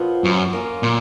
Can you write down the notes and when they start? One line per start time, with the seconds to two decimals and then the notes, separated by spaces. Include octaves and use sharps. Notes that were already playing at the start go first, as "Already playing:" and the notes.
Already playing: A#2 F3 B3 F4
0.24 F#2
0.53 A#3 C#4 F4
0.83 A#2